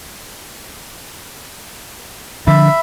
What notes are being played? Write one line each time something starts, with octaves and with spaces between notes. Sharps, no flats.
D3 F3 D4 E5 B5